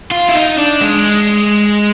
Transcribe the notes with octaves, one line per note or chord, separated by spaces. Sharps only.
F4
E4
D#4
D4
G#3